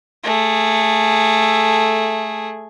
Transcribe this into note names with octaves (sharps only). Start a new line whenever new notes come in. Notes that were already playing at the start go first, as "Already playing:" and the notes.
A3 G#4